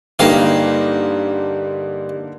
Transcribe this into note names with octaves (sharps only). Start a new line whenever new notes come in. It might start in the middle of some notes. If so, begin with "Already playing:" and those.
G2 D3 A#3 D#4 G4 F5